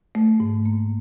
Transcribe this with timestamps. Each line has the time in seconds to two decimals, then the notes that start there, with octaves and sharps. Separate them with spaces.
0.15 A3
0.40 G#2
0.65 A#3